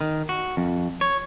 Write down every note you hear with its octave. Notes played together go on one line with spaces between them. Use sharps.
D#3
F#4
F2
C#5